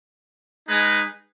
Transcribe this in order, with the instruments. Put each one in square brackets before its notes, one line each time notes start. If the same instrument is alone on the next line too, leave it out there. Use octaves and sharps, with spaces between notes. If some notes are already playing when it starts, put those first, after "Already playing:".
[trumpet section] G#3 D#4 G#4 B4